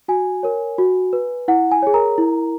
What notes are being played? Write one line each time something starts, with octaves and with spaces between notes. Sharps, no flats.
F#4 G#5
A#4 C#5
F#4
B4
E4 F#5
G#5
G#4 C#5
A#4 A#5
E4